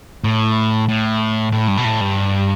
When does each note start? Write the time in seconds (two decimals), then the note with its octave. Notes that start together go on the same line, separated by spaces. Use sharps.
0.24 A2
0.88 A2
1.52 A2
1.68 G2
1.77 B2
1.84 A2
2.01 G2